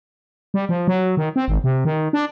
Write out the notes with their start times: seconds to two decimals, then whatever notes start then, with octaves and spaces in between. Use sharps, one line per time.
0.54 G3
0.69 F3
0.88 F#3
1.17 D#3
1.36 C4
1.48 G#1
1.64 C3
1.85 D#3
2.13 D4